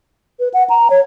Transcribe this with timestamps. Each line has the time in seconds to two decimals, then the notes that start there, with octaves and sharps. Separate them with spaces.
0.40 B4
0.54 F#5
0.69 A#5
0.90 C#5